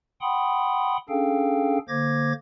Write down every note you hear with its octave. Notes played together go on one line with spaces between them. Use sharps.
F#5 G5 B5 C6 D#6
C#4 D4 G#4 A4 F5 G5
D3 A#3 C5 D6 G#6 A#6